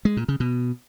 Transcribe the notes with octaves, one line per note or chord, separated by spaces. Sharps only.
G#3
A#2
C#3
B2